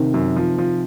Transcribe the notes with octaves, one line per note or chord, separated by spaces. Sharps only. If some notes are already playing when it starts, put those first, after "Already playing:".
Already playing: C3 D#3
F#2
F3
F3